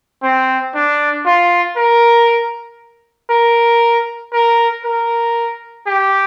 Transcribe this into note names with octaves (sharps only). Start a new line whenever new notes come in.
C4
D4
F4
A#4
A#4
A#4
A#4
G4